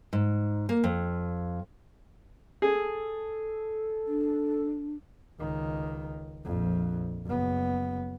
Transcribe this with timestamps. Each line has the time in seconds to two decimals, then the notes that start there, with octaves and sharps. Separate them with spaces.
0.13 G#2
0.69 A#3
0.84 F2
2.62 G#4 A4
4.07 D4
5.39 C#2 D#3
6.45 A#1 F2
7.25 F#1 B3